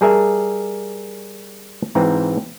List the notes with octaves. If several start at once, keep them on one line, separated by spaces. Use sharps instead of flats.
G3 G#4 A#4 E5
G#2 E3 C4 A#5